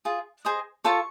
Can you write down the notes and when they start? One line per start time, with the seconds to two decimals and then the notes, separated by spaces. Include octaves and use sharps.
0.05 F4 G#4
0.45 G#4 C5 D#5
0.84 F4 A4 C#5 C#6